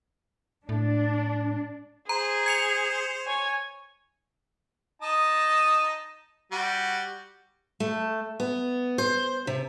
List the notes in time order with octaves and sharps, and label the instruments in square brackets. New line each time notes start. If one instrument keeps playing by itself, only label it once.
[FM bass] A2 [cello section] D4
[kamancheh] G#4 [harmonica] C5 [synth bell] A#5
[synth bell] G#6 C#7 F7
[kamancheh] C#5 G#5
[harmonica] D#4 A5 D#6
G3 F#4
[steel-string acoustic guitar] A3
B3
C5
C3